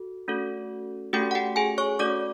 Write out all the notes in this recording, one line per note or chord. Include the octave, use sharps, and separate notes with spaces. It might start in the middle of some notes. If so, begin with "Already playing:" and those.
Already playing: F#4 A4
A3 C#4 F#4 A4
A3 C#4 F#4 G4 A4 G5
F#5
G4 G5
G#4 G#5
C#5 C#6
A3 C#4 F#4 A4 D5 D6